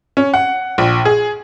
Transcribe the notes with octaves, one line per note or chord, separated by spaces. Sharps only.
C#4
F#5
A#1
G#4